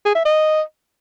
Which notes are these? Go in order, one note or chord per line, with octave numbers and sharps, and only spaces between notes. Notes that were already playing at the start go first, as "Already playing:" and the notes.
G#4
E5
D#5